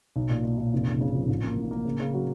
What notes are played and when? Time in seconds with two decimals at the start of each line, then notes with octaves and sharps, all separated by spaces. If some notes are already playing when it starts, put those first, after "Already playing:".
0.16 B1
0.30 A#2
0.44 A#2
0.58 A#2
0.73 F1
0.86 C#3
1.01 C#3
1.14 F3
1.29 A1
1.43 A#3
1.57 A2
1.71 A#3
1.85 C#3
2.00 C#3
2.13 F#3